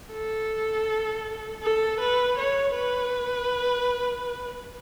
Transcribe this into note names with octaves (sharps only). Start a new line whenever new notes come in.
A4
A4
B4
C#5
B4